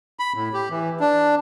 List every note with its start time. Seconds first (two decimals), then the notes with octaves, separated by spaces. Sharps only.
0.19 B5
0.35 A2
0.54 G4
0.71 E3
1.00 D4